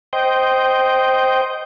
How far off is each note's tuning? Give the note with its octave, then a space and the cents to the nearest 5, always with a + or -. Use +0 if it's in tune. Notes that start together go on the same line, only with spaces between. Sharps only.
C5 +0 D#5 +0 G5 -10